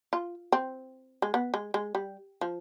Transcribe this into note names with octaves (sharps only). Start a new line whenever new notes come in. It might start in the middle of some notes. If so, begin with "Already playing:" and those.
F4
C4
G#3
B3
G#3
G#3
G3
F3